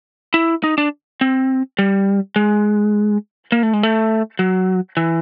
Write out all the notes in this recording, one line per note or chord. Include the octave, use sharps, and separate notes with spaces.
E4
D#4
D4
C4
G3
G#3
A#3
A3
G#3
A3
F#3
E3